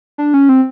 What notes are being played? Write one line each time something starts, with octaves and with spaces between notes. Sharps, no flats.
D4
C#4
C4